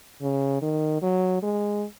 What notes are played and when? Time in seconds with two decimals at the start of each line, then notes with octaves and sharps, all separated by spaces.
0.22 C#3
0.62 D#3
1.02 F#3
1.43 G#3